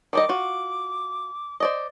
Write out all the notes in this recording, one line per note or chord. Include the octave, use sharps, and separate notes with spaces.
D#3 G3 D#5 D6
F4 F#4
C5 D5 D#5